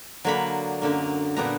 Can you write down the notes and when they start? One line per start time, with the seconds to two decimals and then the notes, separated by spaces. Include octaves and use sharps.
0.25 D3 F#3 A#3 D4 B5
0.82 F#2 D3 A#3
1.36 A#2 G3 B3 D4 A#5